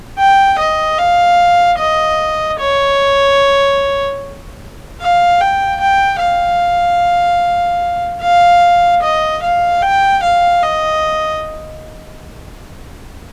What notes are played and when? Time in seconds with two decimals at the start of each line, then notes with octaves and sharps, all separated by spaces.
0.19 G5
0.59 D#5
0.98 F5
1.78 D#5
2.60 C#5
5.01 F5
5.40 G5
5.80 G5
6.21 F5
8.22 F5
9.03 D#5
9.43 F5
9.82 G5
10.23 F5
10.63 D#5